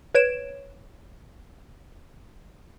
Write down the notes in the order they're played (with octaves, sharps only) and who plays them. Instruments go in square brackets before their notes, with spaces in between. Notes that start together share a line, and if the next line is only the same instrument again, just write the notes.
[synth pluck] B4 C#5 G#6 D7 E7